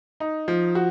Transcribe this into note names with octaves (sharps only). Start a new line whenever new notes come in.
D#4
F3
F#4